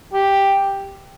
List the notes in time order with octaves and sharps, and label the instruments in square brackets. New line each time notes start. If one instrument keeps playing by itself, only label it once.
[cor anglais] G4